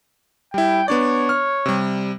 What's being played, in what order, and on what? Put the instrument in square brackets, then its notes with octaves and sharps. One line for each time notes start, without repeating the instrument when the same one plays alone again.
[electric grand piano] G3 E4 [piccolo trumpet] G5
[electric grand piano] B3 D4 D5 [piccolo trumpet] C#5
[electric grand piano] F6
C3 G3